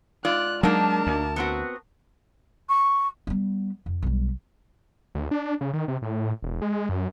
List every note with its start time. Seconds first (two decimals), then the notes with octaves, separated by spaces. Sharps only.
0.25 G#2 F4 D5 F#6
0.63 F#3 G#3 A#3 D4 D#4 A#4 A5
1.07 D2
1.36 B3 C4 F#4
2.69 C#6
3.27 G3 B3
3.86 F2
4.02 B1 G3
5.15 D2
5.31 D4
5.61 C#3
5.73 D#3
5.88 C3
6.02 A2
6.42 E1
6.62 G#3
6.89 F#2